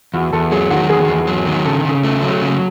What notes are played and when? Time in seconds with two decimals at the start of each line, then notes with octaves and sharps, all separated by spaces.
0.14 E2 F#4
0.33 E2 A4
0.52 F#3 G#4
0.70 D#3 F#4
0.89 E2 G#4
1.08 E2
1.27 F#3
1.46 D#3
1.65 C#3 A4
1.84 C#3
2.04 A3
2.22 F#3
2.42 C#3